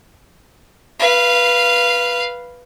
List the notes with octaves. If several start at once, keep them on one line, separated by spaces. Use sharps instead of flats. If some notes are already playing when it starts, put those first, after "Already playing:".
B4 F5